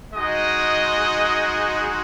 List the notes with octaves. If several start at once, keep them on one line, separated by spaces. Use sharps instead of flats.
G#3 D#4 F#4 D#5